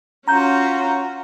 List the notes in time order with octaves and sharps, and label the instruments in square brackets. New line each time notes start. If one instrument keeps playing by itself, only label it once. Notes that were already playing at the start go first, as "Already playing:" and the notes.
[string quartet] C#4 F4 F#4 [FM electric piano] A#5 G6